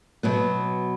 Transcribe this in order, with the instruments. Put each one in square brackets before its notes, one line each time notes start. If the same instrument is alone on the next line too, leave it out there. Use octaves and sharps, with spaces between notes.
[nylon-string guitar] B2 F#3 B3